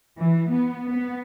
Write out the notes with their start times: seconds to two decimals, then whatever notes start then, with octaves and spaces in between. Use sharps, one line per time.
0.17 E3
0.50 B3
0.91 B3